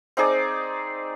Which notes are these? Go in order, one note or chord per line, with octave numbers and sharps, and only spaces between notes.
C4 D#4 G#4 D5